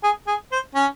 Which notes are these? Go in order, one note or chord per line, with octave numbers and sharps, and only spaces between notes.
G#4
G#4
C5
C#4